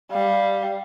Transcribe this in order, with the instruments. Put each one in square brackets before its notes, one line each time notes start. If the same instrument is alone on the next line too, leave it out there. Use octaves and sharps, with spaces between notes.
[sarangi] G3 [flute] F5